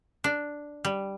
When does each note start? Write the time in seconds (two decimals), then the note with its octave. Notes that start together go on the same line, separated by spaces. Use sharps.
0.24 D4
0.85 G3